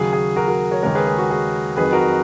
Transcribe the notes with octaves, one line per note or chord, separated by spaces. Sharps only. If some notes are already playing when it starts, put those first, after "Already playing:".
Already playing: D#2 C#3 F#3 G#4
G#4
F#4 A#4
F#4 A#4
A#4 C#5
D#2 C#3 G#3 A#4 C#5
G#4 B4
G#4
F#4
G#4
F2 D#3 F#3 G#4 B4
F#4 A#4